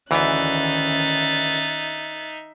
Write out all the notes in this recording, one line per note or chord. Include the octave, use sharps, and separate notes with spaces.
D2 D#3 E3 C#4 D#4 E5 F#6 A6